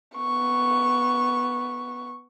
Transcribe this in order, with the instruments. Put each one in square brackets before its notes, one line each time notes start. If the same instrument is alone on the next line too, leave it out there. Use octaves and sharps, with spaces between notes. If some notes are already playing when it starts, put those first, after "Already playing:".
[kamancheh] B3 C#6